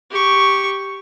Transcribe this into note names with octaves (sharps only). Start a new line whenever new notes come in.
G4 C#6